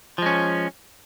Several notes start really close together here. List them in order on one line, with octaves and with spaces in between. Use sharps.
F3 G#3 C#4